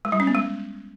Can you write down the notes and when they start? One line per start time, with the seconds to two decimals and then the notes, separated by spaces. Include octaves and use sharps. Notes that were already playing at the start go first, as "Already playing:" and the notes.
0.05 G#3
0.12 G3
0.20 C#4
0.27 B3
0.35 G#3